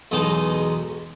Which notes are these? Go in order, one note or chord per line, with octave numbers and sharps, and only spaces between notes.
B1 E2 B2 G#3 D#4 A5